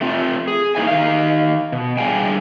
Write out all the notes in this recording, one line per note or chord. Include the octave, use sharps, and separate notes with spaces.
A3 C4 F4
G#4
A#3 B3 D#4 E4 G#5
D#3 F5
B2
D3 G3 G#4 F5 G5 G#5